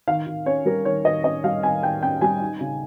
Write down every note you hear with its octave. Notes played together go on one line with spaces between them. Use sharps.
D#3 F5
D#3
C#4 C#5
G3 A#4
D#3 C#5
D#3 D#5
C#4 D#5
G3 F5
D#3 G#5
D#3 G5
C#4 G5
G3 G#5
D#4
C#3